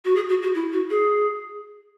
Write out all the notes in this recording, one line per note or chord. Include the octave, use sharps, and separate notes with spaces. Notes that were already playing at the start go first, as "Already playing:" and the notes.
F#4
G#4
F#4
F#4
E4
F#4
G#4